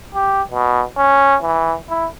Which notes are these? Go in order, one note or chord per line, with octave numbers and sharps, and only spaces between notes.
G4
B2
C#4
E3
E4